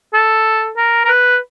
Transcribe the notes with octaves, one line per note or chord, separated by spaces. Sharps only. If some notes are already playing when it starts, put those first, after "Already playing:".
A4
A#4
A#4
B4